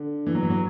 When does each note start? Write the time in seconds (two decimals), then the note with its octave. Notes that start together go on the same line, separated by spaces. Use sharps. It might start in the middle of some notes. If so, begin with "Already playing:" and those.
Already playing: D3
0.26 E3
0.35 F#3
0.43 E3
0.50 F#3